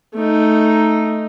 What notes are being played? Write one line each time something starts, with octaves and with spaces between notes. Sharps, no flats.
A3 D#4